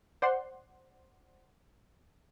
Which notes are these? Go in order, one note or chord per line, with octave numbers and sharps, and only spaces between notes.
C5 D5 F#5 C6